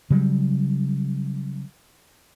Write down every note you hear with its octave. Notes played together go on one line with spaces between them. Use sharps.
C#3 F#3 G3